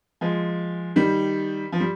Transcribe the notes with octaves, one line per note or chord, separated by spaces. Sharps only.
F3 G#3
D#3 G3
F3
G3